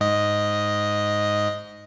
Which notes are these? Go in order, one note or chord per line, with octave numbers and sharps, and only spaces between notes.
G#2 D#5